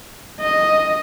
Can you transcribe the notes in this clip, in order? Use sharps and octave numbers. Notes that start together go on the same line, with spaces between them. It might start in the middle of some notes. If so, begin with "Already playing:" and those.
D#5